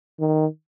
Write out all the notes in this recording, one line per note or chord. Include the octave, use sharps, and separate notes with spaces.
D#3